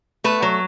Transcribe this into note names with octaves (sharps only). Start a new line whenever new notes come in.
A3 B4
F#3